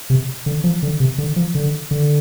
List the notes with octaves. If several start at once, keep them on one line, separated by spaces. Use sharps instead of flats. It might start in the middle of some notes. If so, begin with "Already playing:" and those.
C3
D3
F3
D3
C3
D3
F3
D3
D3